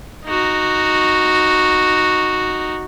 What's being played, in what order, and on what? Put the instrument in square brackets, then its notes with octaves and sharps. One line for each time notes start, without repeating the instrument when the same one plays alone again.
[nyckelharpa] D#4 F#4